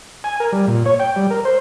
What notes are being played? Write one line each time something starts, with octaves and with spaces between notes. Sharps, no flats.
G#5
A#4
G3
A#2
C#5
G5
G3
A#4
C5